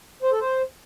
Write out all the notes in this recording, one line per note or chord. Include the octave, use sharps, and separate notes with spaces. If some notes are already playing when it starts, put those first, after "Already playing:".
C5
A4
C5